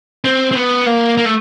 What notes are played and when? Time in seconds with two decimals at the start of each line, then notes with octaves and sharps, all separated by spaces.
0.24 C4
0.52 C4
0.56 B3
0.86 A#3
1.18 A#3
1.25 A3